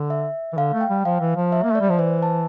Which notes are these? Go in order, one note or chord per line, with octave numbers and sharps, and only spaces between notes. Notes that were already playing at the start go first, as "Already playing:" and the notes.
Already playing: D3
E5
E3
D3 F5
A3
G5
G3
F3 F5
E3
F3
E5
A#3
A3 D5
G3
F3
E3 C5
A5